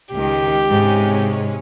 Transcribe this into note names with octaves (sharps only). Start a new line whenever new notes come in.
C#2 D#3 G4
G#2 C3 G#3 C#4